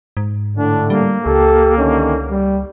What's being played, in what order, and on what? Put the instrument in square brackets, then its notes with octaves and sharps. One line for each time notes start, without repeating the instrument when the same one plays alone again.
[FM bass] G#2
[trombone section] A2 D3 [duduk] D4
[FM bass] G3 [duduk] A#3
[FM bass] C#2 [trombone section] G4 A4
[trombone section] D3 D#3 C#4
G3